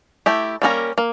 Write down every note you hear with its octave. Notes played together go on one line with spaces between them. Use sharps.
A3 E4 G4
G3 A#3 C#4 E4 A#4
A#3